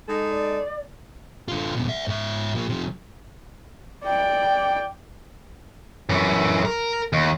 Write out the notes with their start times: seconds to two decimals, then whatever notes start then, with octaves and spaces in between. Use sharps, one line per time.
0.07 G#3 D#4 A4
0.30 D5
1.48 D3 F4
1.75 F2 B2
1.89 D5 E5
2.08 G#2 E5
2.55 F3 A#3
2.69 C3 F3
4.04 D5 G5
6.09 F#2 E3
6.65 A#4
7.13 D#2